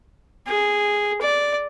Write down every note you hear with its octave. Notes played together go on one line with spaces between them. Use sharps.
G#4
D5